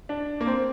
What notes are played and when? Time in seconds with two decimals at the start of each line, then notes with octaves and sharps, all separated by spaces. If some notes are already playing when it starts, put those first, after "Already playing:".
0.09 D4
0.41 A#3
0.47 C4